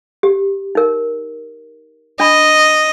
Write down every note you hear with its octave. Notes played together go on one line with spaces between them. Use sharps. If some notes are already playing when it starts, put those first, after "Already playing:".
G4
D#4 A#4
D4 D#5 B5